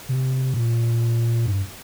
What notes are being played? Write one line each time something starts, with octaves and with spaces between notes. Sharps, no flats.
C3
A#2
G2